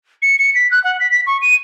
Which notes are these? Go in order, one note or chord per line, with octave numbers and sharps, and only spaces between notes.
C#7
C#7
B6
F#6
F#5
B6
B6
C#6
D#7